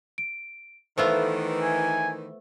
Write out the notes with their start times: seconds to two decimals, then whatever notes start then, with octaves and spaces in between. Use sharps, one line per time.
0.18 D7
0.98 D#3 E3 A3 B3 F4 C5 E5 E6
1.61 G#5